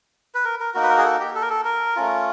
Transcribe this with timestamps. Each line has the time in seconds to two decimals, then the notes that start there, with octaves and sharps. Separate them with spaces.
0.35 B4
0.45 A#4
0.60 A#4
0.74 A#3 D#4 F#4 A#4
0.83 B4
0.90 A#4
0.98 G#4
1.05 A4
1.20 G4
1.35 A4
1.42 A#4
1.50 A4
1.65 A#4
1.96 A3 C#4 F4